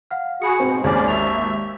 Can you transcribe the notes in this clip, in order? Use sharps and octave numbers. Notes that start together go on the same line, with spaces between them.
F5 F#5 F6
F#4 G#4 G#5 B5 C#7
G#2 B2 C4
G#1 D#2 C#4 G#4 C5 D5 D6
E5 C#6 F7